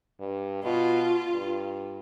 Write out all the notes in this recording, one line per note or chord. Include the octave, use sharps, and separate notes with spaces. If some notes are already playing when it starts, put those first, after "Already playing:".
G2
B2 F4
G2